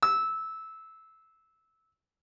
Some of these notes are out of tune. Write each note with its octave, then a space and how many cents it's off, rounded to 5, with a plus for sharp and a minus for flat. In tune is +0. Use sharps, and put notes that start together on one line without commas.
E6 -15